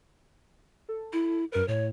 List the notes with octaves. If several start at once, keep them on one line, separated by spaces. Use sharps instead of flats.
A4
E4
F#2 A#4 B4
A2 C#5